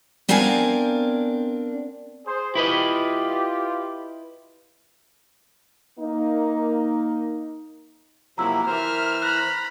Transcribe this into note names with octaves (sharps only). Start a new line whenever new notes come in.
B3 C4 D4 A#4 F5 G#5
G#4 C5
E4 F4 G4 B4 D#5
A#3 D#4
C3 F3 F#3 A#3 E4 A#5 E6
E3 A#4 C5 E5 F6
A#5 B5 F#6